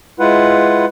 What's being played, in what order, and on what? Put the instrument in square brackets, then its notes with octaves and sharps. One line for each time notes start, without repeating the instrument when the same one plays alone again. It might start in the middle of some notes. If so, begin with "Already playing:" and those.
[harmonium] G#3 E4 F4 B4 F#5